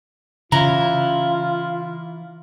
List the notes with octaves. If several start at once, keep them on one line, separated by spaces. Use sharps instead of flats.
C#3 E3 E4 F4 A#5